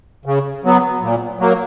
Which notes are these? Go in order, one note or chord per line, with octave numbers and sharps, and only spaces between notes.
C#3
F#3 B3
A#2
F#3 A#3